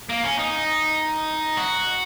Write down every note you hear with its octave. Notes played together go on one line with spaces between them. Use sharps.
A#3
C#4
D#4
F#4